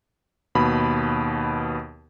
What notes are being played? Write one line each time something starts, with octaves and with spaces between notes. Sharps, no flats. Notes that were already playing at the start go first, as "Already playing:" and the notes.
D#2 B2 B5